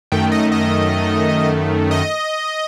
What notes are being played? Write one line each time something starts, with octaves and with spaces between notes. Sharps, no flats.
F#2 D#3 A3 G5
D#5
D#5
D#5